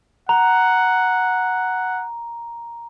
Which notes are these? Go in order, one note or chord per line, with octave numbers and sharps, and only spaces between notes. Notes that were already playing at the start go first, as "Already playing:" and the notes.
F#5 A#5